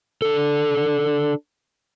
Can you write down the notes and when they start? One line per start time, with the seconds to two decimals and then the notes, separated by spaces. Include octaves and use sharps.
0.22 D4 A4